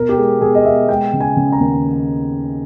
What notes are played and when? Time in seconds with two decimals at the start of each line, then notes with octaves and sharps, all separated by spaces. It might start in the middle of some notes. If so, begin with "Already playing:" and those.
Already playing: B2 A#4
0.09 G4
0.17 G#3 G#4
0.41 B2 G#4
0.55 D#5
0.65 B3 E5
0.89 G#3 G5
1.13 C#3
1.21 G#5
1.37 C#3
1.52 A#5
1.60 D#2